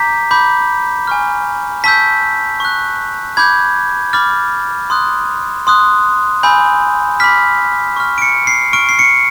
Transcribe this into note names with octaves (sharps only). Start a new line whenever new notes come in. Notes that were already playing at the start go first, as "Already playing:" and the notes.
Already playing: A#5 D6 G6 B6
B5 D6 G6
G#5 C#6 F6
A5 C#6 E6 G6 B6
C#6 F#6
B5 D6 G6 G#6
B5 D6 F6 A6
C6 D#6 F#6
C6 D#6 F#6
G#5 B5 E6 G6
B5 D6 F6 B6
C#6 F6
D7
C#7
C7
C#6 F6 D7
C7
C#7